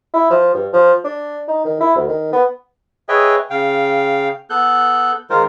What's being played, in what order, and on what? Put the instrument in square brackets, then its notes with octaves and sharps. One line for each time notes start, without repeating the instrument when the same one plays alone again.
[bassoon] E4
F3
G2
F3
D4
D#4
D#3
E4
D2
D#3
B3
[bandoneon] G#4 B4 C#5 D#5 E5 G5
C#3 F5 G5
B3 A4 F#6 G6
D#3 G#3 F4 A#4 C5